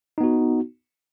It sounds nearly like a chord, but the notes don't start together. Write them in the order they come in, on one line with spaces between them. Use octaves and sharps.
D#4 B3 F#4